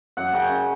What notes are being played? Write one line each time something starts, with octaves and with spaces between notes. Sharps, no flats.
F#2 F#5
C#3 G5